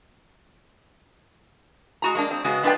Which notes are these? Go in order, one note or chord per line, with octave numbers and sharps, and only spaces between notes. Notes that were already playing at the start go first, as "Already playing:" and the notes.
G#3 F#4 A#5
G#3 A#3 D4
C4
C#3 G#3 B3 F#4
G#3 D4 F4 B4 D5 G5